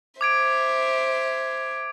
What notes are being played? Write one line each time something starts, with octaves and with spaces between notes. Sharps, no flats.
C5 E5 D6 G#6 D7